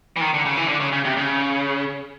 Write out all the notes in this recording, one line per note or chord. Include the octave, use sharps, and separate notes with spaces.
E3
D#3
D3
C#3
E3
D3
C#3
C#3
C3
C#3